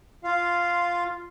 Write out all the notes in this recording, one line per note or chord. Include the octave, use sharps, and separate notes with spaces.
F4 F5